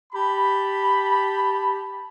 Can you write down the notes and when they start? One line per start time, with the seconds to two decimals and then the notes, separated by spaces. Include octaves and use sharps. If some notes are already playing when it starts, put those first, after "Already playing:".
0.13 G4 A5 B5